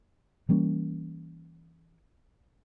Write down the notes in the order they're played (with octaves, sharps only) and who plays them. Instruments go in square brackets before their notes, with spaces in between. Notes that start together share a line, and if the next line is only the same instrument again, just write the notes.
[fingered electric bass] E3 G3 A#3 C#4